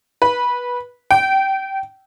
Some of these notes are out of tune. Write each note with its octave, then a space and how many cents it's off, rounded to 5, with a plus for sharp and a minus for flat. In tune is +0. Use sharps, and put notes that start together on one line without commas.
B4 -15
G5 -25